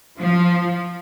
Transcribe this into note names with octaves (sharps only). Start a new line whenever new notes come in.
F3